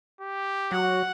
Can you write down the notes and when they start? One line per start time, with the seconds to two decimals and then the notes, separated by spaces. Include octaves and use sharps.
0.21 G4
0.72 F#3 F#4 F#5